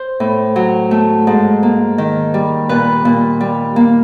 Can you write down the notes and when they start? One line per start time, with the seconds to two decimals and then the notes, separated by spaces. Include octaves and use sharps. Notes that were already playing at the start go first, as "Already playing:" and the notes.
Already playing: C5
0.20 A2
0.56 F#3
0.91 A3
1.27 G#2
1.63 A#3
1.98 D#3
2.34 G3
2.69 A#2 B4
3.05 A#2
3.41 G3
3.76 A#3